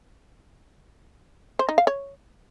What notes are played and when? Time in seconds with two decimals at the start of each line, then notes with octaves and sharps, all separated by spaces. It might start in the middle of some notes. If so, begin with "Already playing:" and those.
1.59 C5
1.69 D#4
1.78 F5
1.87 C#5